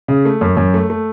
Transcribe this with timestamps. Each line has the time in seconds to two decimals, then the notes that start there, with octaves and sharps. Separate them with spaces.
0.08 C#3
0.25 A3
0.41 F#2
0.57 F#2
0.74 A3
0.90 A3